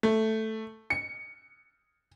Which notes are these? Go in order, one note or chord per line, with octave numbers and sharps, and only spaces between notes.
A3
C#7